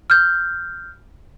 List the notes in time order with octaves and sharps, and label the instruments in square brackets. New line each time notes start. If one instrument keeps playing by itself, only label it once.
[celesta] F6 G6